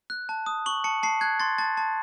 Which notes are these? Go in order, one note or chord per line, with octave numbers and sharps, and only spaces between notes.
F#6
A5
D#6
C#6 F#7
A5 C#7
A5 C7
F#6 G#6
C6 A6
A5 A6
A5